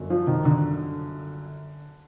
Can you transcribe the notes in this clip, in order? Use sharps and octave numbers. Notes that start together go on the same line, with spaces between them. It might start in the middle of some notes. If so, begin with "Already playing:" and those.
Already playing: G1 F#2
F3
D#3
D3